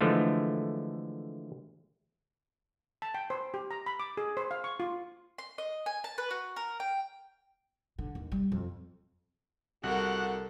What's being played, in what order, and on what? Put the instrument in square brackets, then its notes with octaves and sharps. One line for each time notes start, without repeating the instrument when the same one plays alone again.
[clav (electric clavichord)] D3 E3 F3 G#3 A3
[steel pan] A5
G5
C5
G4
A#5
B5
D6
G#4
C5
F5
C#6
F4
[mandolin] C6
D#5
G#5
A5
B4
F#4
A#4
G5
[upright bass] D3
D#2
G3
F2
[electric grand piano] C2 G3 [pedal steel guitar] F#4 [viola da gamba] A4 A#4 [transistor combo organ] F#5